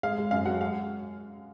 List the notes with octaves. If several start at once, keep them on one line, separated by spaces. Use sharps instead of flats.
G#3 F5
G#3
F#2 F5
F#3 F#5
G#3 F5